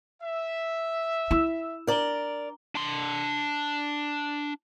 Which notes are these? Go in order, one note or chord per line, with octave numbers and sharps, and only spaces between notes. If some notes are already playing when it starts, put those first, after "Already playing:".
E5
E4 E6 E7
D4 A#4 D5 A#5 G7
D4 C6